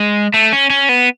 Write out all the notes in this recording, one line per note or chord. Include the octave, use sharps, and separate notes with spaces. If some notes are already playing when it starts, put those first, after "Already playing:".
Already playing: G#3
A3
C#4
C#4
B3